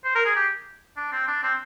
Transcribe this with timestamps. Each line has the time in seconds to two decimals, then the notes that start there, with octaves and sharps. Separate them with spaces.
0.05 C5
0.15 A#4
0.25 G#4
0.36 G4
0.97 D4
1.12 C4
1.28 D4
1.43 C4